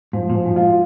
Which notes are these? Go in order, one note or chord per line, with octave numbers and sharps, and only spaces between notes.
G#2 F3
A#2
F3
G#2
F4